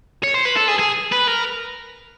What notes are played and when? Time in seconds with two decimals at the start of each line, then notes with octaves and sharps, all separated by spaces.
0.24 C#5
0.35 C5
0.46 B4
0.57 A4
0.68 G#4
0.79 G#4
1.12 B4
1.27 A#4